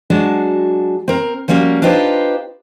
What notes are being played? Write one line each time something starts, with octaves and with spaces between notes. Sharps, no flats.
F#3 G#3 D4 F#4 A5
C4 A#4
F3 G3 A#3 C#4 F#4
D4 D#4 F4 G4 B4 C5